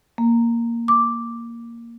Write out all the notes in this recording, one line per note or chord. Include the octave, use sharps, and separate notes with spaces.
A#3
D6